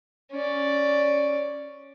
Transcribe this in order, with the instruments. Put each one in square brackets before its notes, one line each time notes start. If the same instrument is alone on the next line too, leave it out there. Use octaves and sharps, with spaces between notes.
[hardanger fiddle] C#4 D5